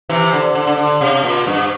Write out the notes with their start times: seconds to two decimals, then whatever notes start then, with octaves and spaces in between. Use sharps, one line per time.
0.09 C3 E3
0.33 D3
0.55 D3
0.67 D3
0.78 D3
1.01 C3
1.24 A#2
1.47 G2